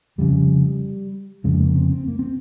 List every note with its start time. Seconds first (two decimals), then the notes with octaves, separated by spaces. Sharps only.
0.18 F1 F2 C#3 G3
1.44 F1 F2 C#3 G#3
1.60 A#3
1.76 C4
1.92 C4
2.08 A#3
2.19 C4